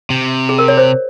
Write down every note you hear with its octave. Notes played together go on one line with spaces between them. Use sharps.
C3
G#4
A#4
C#5
C5